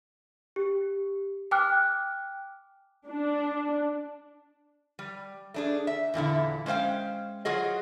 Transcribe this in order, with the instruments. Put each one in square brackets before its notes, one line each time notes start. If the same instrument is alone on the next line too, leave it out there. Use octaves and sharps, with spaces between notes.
[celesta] G4
G5 G#5 D6 F6 F#6
[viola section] D4
[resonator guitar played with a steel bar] G3
A3 D4 G#4
E5
E2 A#2 D3 E4
G#3 C#4 C5 F5 G5
F#3 F4 F#4 G#4 D#5